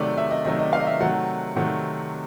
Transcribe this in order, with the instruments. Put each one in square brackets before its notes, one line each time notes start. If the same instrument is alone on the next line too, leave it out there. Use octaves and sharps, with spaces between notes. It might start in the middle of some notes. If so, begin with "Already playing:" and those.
Already playing: [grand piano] C3 D#3 F#3 A3 [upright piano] D5
[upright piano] E5
D#5
[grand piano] C3 D#3 F#3 A3 [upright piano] D#5
[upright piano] D#5
F5
D#5
E5
[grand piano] C3 D#3 F#3 A3 [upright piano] F#5
[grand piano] C3 D#3 F#3 A3 [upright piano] F#5